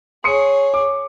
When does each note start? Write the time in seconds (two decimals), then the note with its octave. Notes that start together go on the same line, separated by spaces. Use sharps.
0.24 G#4 C#5 C6 D#6 C#7
0.74 D6